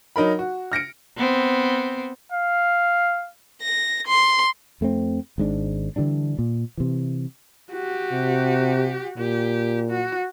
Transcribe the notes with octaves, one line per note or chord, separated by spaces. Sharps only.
F#3 D#4 A#4 B5
F#4
F6 A#6 C#7 D7
B3 C4
F5
A#6
C6
F2 A3 A#3 C4
G#1 G#2 D4
D3 E3 G3 D4
A#2
C3 E3
F#4 G4
C3
A#2 G4
F#4